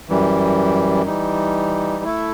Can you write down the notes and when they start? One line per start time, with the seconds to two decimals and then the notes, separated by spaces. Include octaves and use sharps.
0.09 F#2 E3 G3
1.06 E3 G3 D#4
2.04 A3 E4 A4